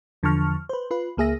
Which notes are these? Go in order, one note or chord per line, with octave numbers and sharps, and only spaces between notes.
E2 D3 F3 A5 C#6 F6
B4 C5
F4 B4
C#2 A#3 G#4 E5 A#6